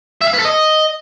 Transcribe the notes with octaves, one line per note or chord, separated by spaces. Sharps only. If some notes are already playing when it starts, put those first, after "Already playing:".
E5
F5
B4
A4
D#5